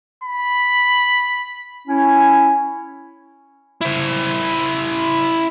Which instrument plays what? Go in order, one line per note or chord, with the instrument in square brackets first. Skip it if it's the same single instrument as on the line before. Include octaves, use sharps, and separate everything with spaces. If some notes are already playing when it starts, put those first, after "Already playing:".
[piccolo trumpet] B5
[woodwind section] C#4 E4
[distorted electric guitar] E4 C5